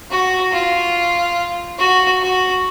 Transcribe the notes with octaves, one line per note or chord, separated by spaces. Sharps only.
F#4
F4
F#4
F#4